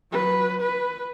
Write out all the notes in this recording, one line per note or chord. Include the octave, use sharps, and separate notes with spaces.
F#3 B4
B4